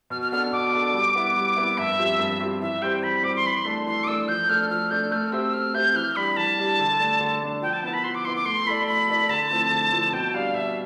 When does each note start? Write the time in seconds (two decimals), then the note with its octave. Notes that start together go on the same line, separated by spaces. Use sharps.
0.10 B2 F6
0.21 F6
0.32 B3 D4 A4 F6
0.52 B2 D6
0.73 B3 D4 A4
0.94 G3
1.15 B3 E4 B4 E5
1.36 G3
1.56 B3 E4 B4 E5
1.78 G2 E5
1.98 F3 C4 G4
2.19 G2
2.40 F3 C4 G4
2.61 E3 E5
2.82 G3 C4 G4 C5 G5
3.03 E3 B5
3.23 G3 C4 G4 C5 D6
3.36 C6
3.44 E3 B5
3.57 C6
3.65 A3 D4 A4
3.86 E3 C6
4.03 D6
4.07 A3 D4 A4 E6
4.28 F3 G6
4.49 A3 D4 A4 F6
4.70 F3 F6
4.90 A3 D4 A4 G6
5.11 A3 F6
5.32 C4 G4 C5 E5 E6
5.53 A3 F6
5.74 C4 G4 C5 E5 G6
5.95 E3 F6
6.16 G3 D4 G4 B5
6.36 E3 A5
6.58 G3 D4 G4
6.79 D3
7.00 A3 D4
7.21 D3
7.41 A3 D4
7.62 F3 G5
7.73 A5
7.83 B3 E4 B4 A5
7.93 B5
8.04 F3 C6
8.14 D6
8.25 B3 E4 B4 C6
8.36 D6
8.45 A3 C6
8.66 E4 A4 D5 B5
8.87 A3 B5
9.08 E4 A4 D5
9.29 D3 A5
9.50 F3 A3 C4 E4
9.71 D3
9.91 F3 A3 C4 E4
10.12 B2 G5
10.34 G3 D4 F5
10.54 B2 E5